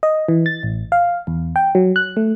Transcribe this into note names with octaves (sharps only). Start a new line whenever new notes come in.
D#5
E3
A6
A1
F5
E2
G5
F#3
F#6
A3